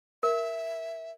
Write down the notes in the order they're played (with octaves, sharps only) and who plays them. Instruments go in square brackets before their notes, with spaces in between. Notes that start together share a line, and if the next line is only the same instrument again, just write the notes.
[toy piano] A#4 [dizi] E5